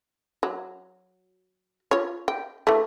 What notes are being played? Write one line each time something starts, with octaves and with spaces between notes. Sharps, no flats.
F#3
F4 C#5
G5
E3 A3